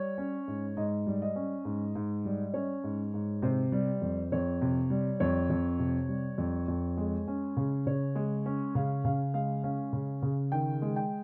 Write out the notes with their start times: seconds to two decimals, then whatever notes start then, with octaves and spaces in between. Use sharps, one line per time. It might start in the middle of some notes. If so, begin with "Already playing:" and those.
Already playing: G3 C#5
0.18 C#4
0.48 G#2
0.77 G#2 D#5
1.07 G3
1.22 D#5
1.36 C#4
1.65 G#2
1.95 G#2
2.25 G3
2.54 C#4 C#5
2.84 G#2
3.14 G#2
3.42 C3 C5
3.72 G3
4.02 F2
4.32 F2 C#5
4.62 C3
4.90 G3
5.20 F2 C#5
5.50 F2
5.79 C3
6.09 G3
6.38 F2
6.68 F2
6.97 G#3
7.28 C#4
7.57 C#3
7.86 C#3 C#5
8.15 G#3
8.46 C#4
8.75 C#3 F5
9.05 C#3 F5
9.34 G#3 F5
9.64 C#4 F5
9.93 C#3
10.22 C#3
10.52 D#3 G5
10.82 G#3
10.96 G5